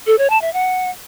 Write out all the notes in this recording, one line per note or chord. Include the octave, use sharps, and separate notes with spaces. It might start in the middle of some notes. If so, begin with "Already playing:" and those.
A4
C#5
A5
E5
F#5